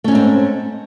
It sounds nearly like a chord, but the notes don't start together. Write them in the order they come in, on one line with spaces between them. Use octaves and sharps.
A3 C#4 G#2 C4